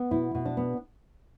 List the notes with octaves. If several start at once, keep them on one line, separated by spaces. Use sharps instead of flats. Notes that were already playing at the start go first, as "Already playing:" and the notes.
Already playing: B3
B2 E4
B2
D4
B3